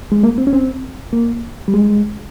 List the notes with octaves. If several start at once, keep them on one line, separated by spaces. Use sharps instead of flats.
G#3
A#3
C4
C#4
C4
A#3
G3
G#3